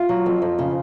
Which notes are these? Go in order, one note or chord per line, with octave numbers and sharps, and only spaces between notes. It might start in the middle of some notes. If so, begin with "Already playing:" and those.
Already playing: F4
F#3
F2
F2
C#3